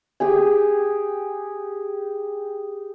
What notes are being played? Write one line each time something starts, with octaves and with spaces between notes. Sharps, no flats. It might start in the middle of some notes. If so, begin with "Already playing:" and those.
G4 G#4 G#5